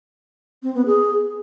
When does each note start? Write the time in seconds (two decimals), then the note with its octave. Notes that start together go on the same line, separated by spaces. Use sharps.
0.63 C4
0.75 B3
0.86 G#4